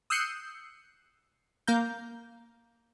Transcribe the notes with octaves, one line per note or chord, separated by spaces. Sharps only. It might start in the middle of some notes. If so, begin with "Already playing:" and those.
D#6 E6 F#6 G6 C7 C#7
A#3 F5 A#5 G6